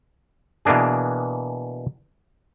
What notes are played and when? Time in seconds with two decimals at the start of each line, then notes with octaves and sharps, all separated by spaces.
0.65 B2 E3 A#3 D4 G#4